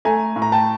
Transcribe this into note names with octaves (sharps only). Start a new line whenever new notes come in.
A3 G#5 A#5
A2
A#5
G5 A5